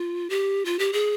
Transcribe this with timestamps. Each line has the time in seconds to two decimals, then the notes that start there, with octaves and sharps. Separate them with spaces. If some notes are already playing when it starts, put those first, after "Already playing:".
Already playing: F4
0.30 G4
0.65 F4
0.79 G4
0.93 G#4